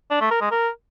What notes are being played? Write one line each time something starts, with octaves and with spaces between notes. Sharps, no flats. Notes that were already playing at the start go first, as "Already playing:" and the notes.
D4
A3
A#4
G#3
A#4